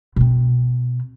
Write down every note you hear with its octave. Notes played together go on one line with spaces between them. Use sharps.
B2 C4